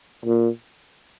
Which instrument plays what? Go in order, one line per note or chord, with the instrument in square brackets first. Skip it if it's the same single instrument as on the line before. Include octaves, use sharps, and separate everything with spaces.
[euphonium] A#2